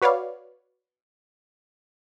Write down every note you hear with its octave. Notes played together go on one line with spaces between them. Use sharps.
F#4 B4 C#5 D5 F5